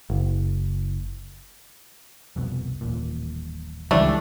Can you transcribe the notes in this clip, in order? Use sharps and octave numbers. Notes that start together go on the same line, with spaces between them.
F#1
F1 C2 B2
D#1 A1 A#2
C#2 E3 G3 A3 D4